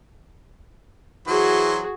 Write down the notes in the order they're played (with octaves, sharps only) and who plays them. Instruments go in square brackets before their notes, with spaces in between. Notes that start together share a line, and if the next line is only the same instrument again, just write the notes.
[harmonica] E3 F#3 C5 [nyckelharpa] F#4 G#4